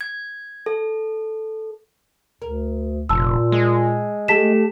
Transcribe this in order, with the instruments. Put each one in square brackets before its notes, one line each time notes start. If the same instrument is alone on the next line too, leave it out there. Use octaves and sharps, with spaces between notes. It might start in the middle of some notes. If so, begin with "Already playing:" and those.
[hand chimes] G#6
A4
[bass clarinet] D2 [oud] A#4
[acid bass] F1 [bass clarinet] A#2 [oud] F4 [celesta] A5 E6
[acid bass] G#3
[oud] A3 A4 [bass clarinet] G4 [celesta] A5 B6 E7